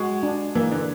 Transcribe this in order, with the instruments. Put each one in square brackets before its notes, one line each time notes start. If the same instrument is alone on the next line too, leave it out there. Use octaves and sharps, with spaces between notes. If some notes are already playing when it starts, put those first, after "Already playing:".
Already playing: [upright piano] G#3 [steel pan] F#4
[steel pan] D4
[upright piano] E3 [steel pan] A#3
[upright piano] D3